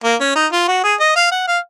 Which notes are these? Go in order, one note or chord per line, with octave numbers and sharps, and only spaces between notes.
A#3
C#4
D#4
F4
F#4
G#4
D#5
F5
F#5
F5